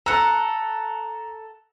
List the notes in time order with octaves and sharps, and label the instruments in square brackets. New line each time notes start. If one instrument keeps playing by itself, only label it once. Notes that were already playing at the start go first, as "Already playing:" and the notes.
[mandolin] A4 F#5 [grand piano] A#5